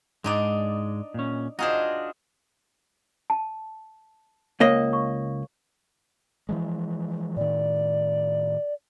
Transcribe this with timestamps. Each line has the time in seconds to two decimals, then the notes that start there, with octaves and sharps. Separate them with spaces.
0.24 G#2 G#3 D4 D#4 D5
1.14 A#2 C#4
1.59 D4 D#4 F4 F#4 G#4 C5
3.30 A5
4.60 C#2 A#3 C#5 D#5
4.93 C#6
6.49 E3 F3 G#3
7.37 A2 D#3 D5